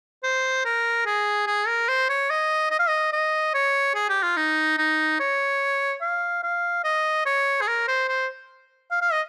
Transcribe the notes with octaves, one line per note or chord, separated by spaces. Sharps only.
C5
A#4
G#4
G#4
A#4
C5
C#5
D#5
D#5
F5
D#5
D#5
C#5
G#4
G4
F4
D#4
D#4
C#5
F5
F5
D#5
C#5
G#4
A#4
C5
C5
F5
F5
D#5